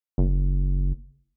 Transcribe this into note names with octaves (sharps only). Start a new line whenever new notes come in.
F#1